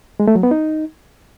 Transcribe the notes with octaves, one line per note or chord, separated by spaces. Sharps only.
G#3
A3
F#3
B3
D#4